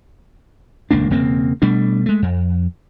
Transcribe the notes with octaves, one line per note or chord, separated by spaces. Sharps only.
D#1 C#2 A#3 D4
E1 C#3 A#3 C4
B2 G3 A3 D4
G#3 A3
F2